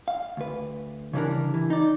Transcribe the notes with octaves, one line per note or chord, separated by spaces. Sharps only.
F5
D2 B4
C#3 E3 G3 D4 A#4
E3
D#4 D5